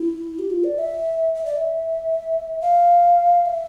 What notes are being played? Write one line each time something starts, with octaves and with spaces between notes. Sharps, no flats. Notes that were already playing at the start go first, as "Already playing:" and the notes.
Already playing: E4
G4
F4
D5
E5
E5
D5
E5
F5
E5